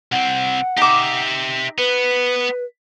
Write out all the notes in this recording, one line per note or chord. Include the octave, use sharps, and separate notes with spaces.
C2 C4 F#5
D#4 G4 E5 D6
B3 B4